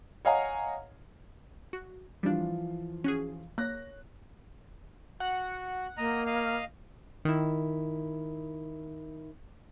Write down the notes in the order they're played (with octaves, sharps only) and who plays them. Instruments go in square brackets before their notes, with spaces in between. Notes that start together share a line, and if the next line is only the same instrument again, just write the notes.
[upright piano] C#5 D#5 F5 F#5 G#5 A#5
[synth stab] F#4
[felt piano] E3 F3 F4 [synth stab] G3 D4
[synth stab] C#4 F#4 G#4
[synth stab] A#3 A#6 [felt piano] C#5 F#6
[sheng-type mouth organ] F#4 [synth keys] F#5
[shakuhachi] A#3 [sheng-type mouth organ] D#5 A#5
[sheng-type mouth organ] D#5 F5 F6
[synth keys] D#3 E4